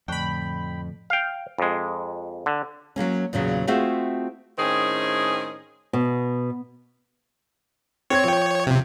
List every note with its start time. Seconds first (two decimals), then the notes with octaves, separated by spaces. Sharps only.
0.08 F2 A2 D3 A3 G5 B5
1.10 F5 G5
1.58 F2 G#3
2.46 D3
2.96 F#3 G3 A#3 C#4
3.33 E2 A#2 C#3 F#3
3.67 A3 C4 F4 F#4 G#4 E5
4.59 A2 D#3 C4 C#4 G#4
5.93 B2
8.10 C4 C#5 G#6
8.24 F3 G5
8.67 C3